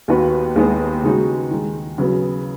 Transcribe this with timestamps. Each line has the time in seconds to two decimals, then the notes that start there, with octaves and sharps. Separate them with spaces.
0.08 D#2 D#3 B3 F#4 B4
0.56 D#2 D#3 G#3 B3 G#4
1.03 C#3 G#3 D#4 F#4 B4
1.51 D#3 G#3 D#4
1.98 C#3 F#3 B3